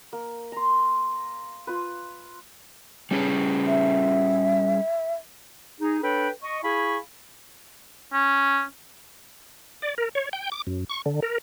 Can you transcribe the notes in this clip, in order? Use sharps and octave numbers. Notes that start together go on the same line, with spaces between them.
A#3
A#5 C6
F4 B4
G3 C#4 G#4
E5
D#4 G#4
D4 A4 B4 C#5 G5 B5
D#5 C#6
E4 G#4 F5 G#5 B5 C#6
C#4
D5
A#4
C#5
G5
D6
F#2
C#6
D3
A#4